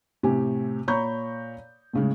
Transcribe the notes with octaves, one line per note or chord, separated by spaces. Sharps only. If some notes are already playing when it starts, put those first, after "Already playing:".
A2 C3 G4 G#5
A#2 C#5 A#5 B5 C#6 G6
A2 C#3 G#3